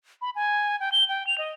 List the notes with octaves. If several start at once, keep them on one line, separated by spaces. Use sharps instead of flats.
B5
G#5
G5
G7
G5
F7
D#5